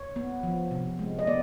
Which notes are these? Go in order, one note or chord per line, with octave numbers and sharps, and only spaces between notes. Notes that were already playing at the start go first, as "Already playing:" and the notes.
Already playing: C#5
B3
F3
C3
G#3
D#5
B3 D5